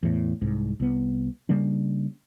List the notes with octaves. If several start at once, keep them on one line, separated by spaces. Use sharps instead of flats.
E2 A2
C2 G#2
C2 B3
C#3 G3 A#3 D4